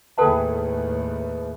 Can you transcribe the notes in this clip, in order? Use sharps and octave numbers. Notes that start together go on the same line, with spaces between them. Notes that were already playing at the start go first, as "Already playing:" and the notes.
D#2 A2 G#4 A4 B4 E5 G5 A5